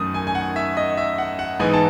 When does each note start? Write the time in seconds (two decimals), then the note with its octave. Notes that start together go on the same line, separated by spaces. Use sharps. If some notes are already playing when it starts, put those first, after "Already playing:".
Already playing: F#2 D#3 A3 D#6
0.14 G#5
0.27 G#5
0.35 F#5
0.56 E5
0.77 D#5
0.97 E5
1.18 F#5
1.39 F#5
1.60 G#2 E3 B3 D#4 G#5
1.74 A5